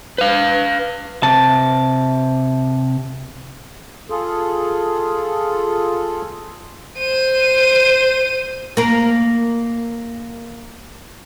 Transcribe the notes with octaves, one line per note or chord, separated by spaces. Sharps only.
B4 F5
C3 A5
F4 G#4 A4
C5 D#7
A#3 A#4